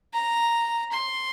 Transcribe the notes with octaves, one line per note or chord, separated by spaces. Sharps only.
A#5
C6